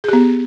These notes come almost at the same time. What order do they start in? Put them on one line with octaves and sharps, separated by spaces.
G#4 G4 B3